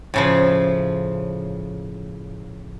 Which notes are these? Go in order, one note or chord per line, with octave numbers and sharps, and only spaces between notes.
A2 C#3 F3